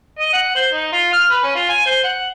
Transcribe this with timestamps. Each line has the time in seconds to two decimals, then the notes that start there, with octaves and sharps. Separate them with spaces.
0.19 D#5
0.33 F#5
0.55 C5
0.73 D#4
0.92 F4
1.13 F6
1.30 B4
1.43 C#4
1.55 F4
1.69 G#5
1.86 C5
2.04 F#5